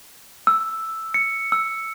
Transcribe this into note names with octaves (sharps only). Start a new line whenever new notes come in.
E6
C#7
E6